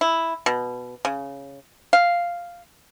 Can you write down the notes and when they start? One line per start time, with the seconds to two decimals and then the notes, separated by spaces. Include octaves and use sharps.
0.01 E4
0.46 B2
1.05 C#3
1.93 F5